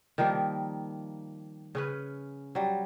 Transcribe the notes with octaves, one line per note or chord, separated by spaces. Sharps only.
D#3 F3 G3 A#3
C#3 C#4 B4
F#3 G3